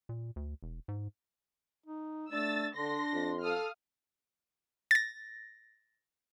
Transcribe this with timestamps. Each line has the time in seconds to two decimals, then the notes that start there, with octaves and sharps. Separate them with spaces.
0.09 A#2
0.36 D2
0.63 E1
0.88 G#2
1.86 D#4
2.32 A3 D4 E6 A6
2.77 D3 D4 C6 A#6
3.13 F2
3.42 A4 F5 D#6 F6
4.91 A6 A#6